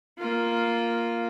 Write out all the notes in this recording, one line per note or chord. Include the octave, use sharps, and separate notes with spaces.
A#3 F4